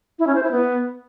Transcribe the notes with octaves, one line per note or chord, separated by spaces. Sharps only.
E4
C#4
C5
E4
B3